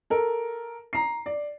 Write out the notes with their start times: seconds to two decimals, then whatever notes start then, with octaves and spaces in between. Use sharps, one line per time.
0.10 A4 A#4
0.93 A#5 C7
1.26 D5